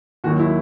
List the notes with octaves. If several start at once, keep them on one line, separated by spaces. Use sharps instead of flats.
D#2 D#3 F#3 F#4
E4